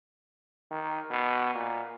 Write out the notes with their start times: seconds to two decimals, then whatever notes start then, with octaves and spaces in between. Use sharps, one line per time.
0.71 D#3
1.11 B2
1.55 A#2